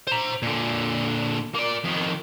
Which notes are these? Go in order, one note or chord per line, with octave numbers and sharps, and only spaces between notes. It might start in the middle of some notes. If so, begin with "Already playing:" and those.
C5 A#5
A#2 D3
A#3 D5
F2 D#3